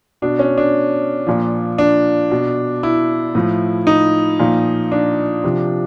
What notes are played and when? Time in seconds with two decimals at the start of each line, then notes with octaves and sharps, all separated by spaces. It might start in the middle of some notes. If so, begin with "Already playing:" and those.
0.22 B2 D4
0.39 C#4
0.58 D4
1.27 A#2 F3
1.78 D4
2.31 B2
2.83 E4
3.35 A2 F3
3.87 D#4
4.39 A#2 F3
4.92 D4
5.44 C3 F3